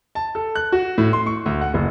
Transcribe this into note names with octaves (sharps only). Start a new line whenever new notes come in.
A5
A4
F#6
F#4
A2
C6
C#6
D2
F#5
F#1